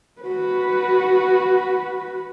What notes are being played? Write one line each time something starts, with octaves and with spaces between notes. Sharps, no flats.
F#4 B4